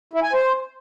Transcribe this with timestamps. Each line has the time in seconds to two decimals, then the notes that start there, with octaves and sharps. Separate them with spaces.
0.13 E4
0.23 G#5
0.33 C5